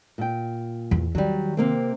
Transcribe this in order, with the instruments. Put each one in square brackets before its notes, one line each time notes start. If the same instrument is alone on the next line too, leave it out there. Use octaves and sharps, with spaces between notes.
[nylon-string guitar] A#2 G5
[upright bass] E2
[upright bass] D#3 [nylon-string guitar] F#3 G3
[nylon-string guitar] C3 A#3 C4